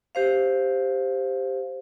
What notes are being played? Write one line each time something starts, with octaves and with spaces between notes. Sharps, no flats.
G4 C5 F5